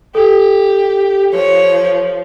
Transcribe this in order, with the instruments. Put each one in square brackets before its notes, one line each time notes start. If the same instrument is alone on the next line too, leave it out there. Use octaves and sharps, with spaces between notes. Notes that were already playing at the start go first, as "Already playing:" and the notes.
[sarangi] G4 [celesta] A4
[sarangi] F3 [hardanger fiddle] C#5